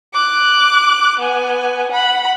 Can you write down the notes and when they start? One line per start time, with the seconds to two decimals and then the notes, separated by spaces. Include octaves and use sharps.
0.14 D6 F#6
1.19 B3 G#5
1.92 F#5 B5